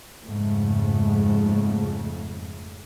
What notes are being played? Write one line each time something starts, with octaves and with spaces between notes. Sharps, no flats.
F2 G#2 C#3 A3